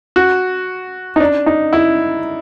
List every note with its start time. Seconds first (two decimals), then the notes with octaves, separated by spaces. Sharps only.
0.16 F#4
1.16 D#4
1.20 D4
1.46 D#4
1.73 E4